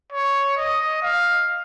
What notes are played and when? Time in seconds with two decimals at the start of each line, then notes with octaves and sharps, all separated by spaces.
0.13 C#5
0.57 D#5
1.03 F5